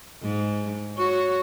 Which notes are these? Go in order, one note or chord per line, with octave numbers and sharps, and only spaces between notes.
G#2
F#4 C#5